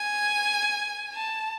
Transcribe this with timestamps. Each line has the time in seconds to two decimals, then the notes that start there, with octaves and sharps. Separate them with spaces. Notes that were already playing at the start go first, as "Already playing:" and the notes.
Already playing: G#5
1.14 A5